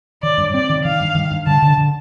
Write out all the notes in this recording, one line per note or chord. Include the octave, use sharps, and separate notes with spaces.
D#3 D5
G2
C4 D5
D#3
D#3 F5
G2
D#3
G2
D3 A5
D3
D3